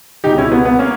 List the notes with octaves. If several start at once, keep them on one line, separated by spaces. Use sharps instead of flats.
C#2 B2 G#3 D#4 G4
C#4 E4
B3
B3
A#3 C#4